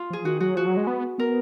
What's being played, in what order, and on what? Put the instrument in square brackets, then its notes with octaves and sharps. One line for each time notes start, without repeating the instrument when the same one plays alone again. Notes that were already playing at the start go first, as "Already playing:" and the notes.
Already playing: [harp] F4
[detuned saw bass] F3 [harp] G#4
[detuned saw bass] D#3 [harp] F#4
[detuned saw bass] F#3 [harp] F#4
[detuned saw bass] F3 [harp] F#4
[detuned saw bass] F#3
G#3
B3
[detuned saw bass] B3 [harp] A#4